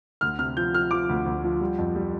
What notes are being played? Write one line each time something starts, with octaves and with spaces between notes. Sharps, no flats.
D2 F6
C3 F6
F3 G6
F3 F6
F3 D6
D2
D2
F3
G3
F2
G3